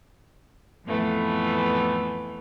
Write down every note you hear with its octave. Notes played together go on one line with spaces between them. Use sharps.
F2 A2 E3 A3 B3